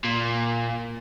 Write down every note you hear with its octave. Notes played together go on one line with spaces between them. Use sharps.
A#2